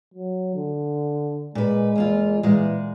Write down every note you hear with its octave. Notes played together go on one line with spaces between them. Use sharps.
F#3
D3
A#2 G#3 B4
E2 A#3 F4
A#2 E3 G#3